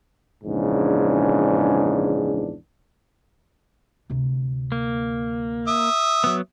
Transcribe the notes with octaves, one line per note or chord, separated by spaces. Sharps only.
A#1 E2 G#2 C#3 D4
D2 C3
A#3
E5 D#6
F#3 B3